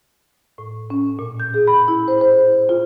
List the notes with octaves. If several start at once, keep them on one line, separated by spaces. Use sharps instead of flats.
A2
C#4
A#2
G6
G#4
B5
E4
C5
C5
F4